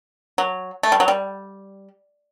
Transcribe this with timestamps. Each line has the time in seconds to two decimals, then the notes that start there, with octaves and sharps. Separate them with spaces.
0.38 F#3
0.83 A3
0.92 G3
1.00 F#3
1.08 G3